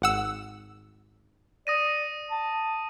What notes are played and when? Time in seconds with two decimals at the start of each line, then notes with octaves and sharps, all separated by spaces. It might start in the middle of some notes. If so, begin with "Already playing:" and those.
0.02 G#1 F#5 E6
1.67 D5 D#6 A#6 D#7
2.30 A5